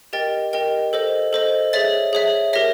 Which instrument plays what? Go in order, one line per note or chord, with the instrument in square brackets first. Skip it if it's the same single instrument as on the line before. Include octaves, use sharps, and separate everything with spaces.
[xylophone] G4 A#4 D#5 G5 A6
G4 A#4 D#5 G5
A4 C5 D#5
A4 C5 D#5
G#4 C#5 E5 A6
G#4 C#5 E5
G4 A#4 C#5 E5 A#6